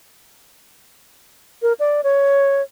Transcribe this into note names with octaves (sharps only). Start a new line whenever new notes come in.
A#4
D5
C#5